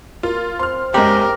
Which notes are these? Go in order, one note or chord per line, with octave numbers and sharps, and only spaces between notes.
A#3 F4
C4 C6 F6
F#1 G#3 G4 A#4